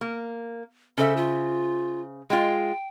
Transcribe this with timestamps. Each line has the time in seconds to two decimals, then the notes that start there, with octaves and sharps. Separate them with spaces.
0.01 A#3
0.98 C#3 A4 C5 E5
1.17 F4
2.30 G#3 F4 G5